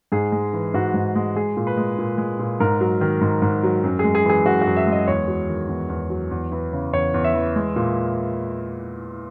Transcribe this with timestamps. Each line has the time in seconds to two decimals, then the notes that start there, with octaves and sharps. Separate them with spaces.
0.12 G#2 G#4
0.32 G#3
0.53 E3
0.74 G#2 F#4
0.94 G#2
1.16 G#3
1.35 G#3 G#4
1.57 A#2
1.67 B4
1.77 G#3
1.98 A#2
2.18 G#3
2.39 A#2
2.60 G#2 A#4
2.81 F#3
3.01 D#3
3.21 G#2
3.42 G#2
3.63 F#3
3.84 F#2
3.99 G#3 G#4
4.15 G#4
4.24 E3
4.30 G#4
4.45 F#2 F#4
4.62 F#2 F#4
4.77 E5
4.87 G#3
4.92 D#5
5.08 E2 C#5
5.28 F#3
5.48 D#3
5.69 E2
5.89 E2
6.10 F#3
6.31 E2
6.52 E3
6.73 C#3
6.93 E2 C#5
7.14 E2
7.24 E5
7.34 E3
7.56 G#3
7.76 A#2